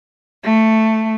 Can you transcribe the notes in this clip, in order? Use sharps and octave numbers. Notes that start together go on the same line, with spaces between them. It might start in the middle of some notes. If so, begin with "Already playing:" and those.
A3